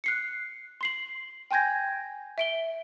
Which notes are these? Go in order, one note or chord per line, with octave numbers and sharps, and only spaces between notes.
F#6 C7 C#7
C6 C7 F#7
G5 G#5 C6 G6 G#6 A#6
E5 D7 G7